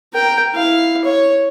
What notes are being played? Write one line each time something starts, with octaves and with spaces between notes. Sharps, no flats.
A#4 G5
E4 F5
C#5